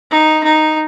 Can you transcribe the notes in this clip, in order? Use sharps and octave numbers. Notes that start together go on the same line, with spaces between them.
D#4
D#4